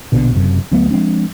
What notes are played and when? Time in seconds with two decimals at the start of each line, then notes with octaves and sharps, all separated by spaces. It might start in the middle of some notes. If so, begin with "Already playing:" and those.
0.12 A#1 B2 D3
0.35 F#1 F#2 C3
0.71 D2 F#3 A3 B3
0.91 F3 G#3 C4 D4